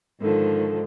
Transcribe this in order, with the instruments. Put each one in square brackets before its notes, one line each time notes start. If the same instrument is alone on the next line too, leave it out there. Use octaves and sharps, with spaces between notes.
[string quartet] G#2 D3 D#3 F3